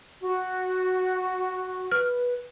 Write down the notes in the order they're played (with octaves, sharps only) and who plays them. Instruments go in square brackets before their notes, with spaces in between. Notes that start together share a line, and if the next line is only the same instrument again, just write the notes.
[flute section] F#4
[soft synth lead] B4 [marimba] F6